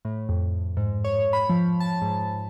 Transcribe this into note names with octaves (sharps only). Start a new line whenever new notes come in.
A2
F2
G#2
C#5
B5
F3
A5
G#2